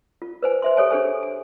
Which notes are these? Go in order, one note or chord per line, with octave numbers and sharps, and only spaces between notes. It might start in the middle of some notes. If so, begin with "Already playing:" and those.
F4
B4 C5 G#5
C5 E5 C6
G4 A4 C#5 G#5
D4 G#4 A4 C5 G#5
G#5